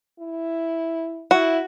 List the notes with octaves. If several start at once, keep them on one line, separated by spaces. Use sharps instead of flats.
E4
E4 F#4